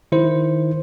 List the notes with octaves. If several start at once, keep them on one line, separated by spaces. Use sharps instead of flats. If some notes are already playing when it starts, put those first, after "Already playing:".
D#3 E4 C5